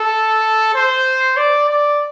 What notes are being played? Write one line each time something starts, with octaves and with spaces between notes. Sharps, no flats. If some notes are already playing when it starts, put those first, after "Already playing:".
Already playing: A4
C5
D5
D5